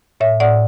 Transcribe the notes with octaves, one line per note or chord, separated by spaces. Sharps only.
A2 C#5 E5
A2 D5 F#5